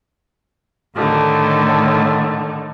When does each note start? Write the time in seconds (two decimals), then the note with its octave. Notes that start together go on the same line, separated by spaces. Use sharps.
0.95 A2 D3 D#3 A3